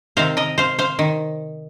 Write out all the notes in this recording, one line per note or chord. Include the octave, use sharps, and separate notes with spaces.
C3 D#3 C4 C5 F5
A#4 D#5
C5 F5
C5 F5
D#3